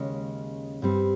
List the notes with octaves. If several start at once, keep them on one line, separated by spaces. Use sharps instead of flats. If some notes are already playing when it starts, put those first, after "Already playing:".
Already playing: D#2 C#3 G#3 C#4
G2 G3 C4